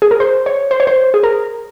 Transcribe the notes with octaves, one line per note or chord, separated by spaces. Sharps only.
G#4
A#4
C5
C#5
C5
C#5
C5
G#4
A#4